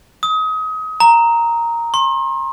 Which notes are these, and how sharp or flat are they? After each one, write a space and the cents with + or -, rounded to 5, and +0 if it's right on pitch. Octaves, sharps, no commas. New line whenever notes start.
D#6 +30
A#5 +0
C6 +40